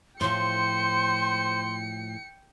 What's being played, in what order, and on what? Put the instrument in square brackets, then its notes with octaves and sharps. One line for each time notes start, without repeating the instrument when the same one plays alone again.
[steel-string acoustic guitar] A2 F3 [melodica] C5 [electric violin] G5 C#7 [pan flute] C6